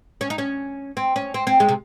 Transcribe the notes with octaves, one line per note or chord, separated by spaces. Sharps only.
C#4
D#4
C#4
C4
C#4
C4
C4
G#3
C3